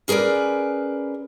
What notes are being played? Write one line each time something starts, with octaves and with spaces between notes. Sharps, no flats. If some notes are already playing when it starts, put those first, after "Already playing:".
C#4 G#4 A#4 B4 D5